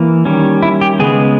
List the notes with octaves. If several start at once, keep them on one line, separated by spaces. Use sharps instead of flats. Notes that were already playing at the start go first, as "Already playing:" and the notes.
Already playing: E3 A#3
D#3 G3 C#4
E4
G4
C#3 G#3 B3 G#4